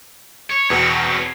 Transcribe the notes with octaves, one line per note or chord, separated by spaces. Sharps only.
C#5
E2 B2 C4 C#5